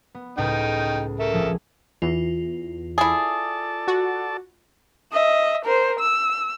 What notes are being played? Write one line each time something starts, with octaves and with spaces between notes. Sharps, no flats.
B3
C#2 A2 D#4 B4 G5
A4 A#4 E5
A#1 F3 G#4
E2 F4
E4 G#4 A4 D5 A5
F#4
D#5 E5
A#4 C5
E6